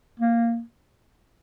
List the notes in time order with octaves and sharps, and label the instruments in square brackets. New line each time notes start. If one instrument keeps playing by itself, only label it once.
[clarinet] A#3